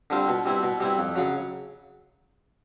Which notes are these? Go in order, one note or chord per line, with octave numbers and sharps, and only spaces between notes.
D3 G3 C4 F4
B2
G3 C4 E4
B2
G3 C4 E4
F2
C#3 F#3